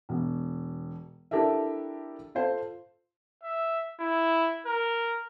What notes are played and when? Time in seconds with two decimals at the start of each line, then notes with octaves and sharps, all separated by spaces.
0.09 E1
1.31 D4 E4 G4 A4 A#4 E5
2.35 F4 A4 C5
3.43 E5
4.00 E4
4.66 A#4